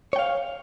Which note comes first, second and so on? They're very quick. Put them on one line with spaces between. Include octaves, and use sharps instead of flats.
C#5 G5 F5